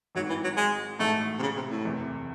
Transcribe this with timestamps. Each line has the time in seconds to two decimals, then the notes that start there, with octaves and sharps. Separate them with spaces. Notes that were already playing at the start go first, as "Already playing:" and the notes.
0.15 G#1 G#2 D#3 F#3
0.29 E3
0.44 F#3
0.57 G#3
0.99 A1 A2 G#3 A3 D#4 F#4
1.39 C3
1.42 C#3
1.55 C3
1.70 A2
1.84 F#1 E2 C3